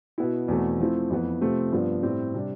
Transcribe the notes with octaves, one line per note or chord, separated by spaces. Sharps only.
B2 B3 E4
E2 B2 A3 C4
F3 A3 C4 E4
F2 E3 B3
C3 F3 A3 C4
G2 F3 B3
A2 G3 C4 G4
C3 G3 D4